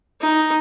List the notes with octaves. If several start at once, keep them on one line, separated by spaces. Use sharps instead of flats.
D#4